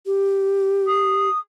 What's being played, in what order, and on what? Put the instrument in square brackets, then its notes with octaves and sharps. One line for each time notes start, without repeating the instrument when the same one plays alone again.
[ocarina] G4
[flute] D#6